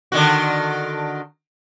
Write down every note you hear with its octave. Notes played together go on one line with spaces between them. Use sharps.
D3 D#3 F#4